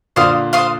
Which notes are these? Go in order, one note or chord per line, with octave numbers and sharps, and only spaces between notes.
A#2 D3 C5 F5 C6 D#6
C5 F5 C6 D#6